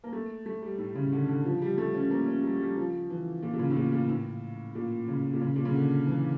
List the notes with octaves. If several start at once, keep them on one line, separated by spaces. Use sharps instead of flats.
A#3
A3
A3
G3
A2
C#3
D3
D3
F3
G3
A3
C#4
A#3
C#4
G3
G3
F3
E3
A#2
A#2
C#3
A2
A#2
A#2
A2
A#2
C#3
A#2
C#3
A#2
C#3
D3
E3